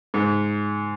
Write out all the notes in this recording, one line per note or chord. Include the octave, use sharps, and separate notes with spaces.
G#2